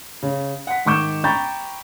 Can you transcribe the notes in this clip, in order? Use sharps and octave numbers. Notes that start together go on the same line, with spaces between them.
C#3
F#5 B6
G#2 D#3 C#6 D6 G6 E7
G5 A#5 B5 C#6 G6 A6